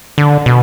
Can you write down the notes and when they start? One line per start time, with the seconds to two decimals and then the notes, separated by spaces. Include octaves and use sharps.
0.18 D3
0.46 B2